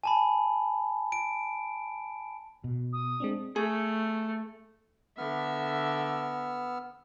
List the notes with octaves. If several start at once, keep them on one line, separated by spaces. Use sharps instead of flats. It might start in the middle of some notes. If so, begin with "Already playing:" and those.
G#5 A5 B5
D7
B2
D#6
G#3 C4 D4
A3 G#4
D3 B3 E5 E6 F6